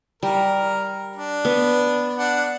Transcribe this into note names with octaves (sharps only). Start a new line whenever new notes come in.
G3 A#4
D4
B3
D4 F#5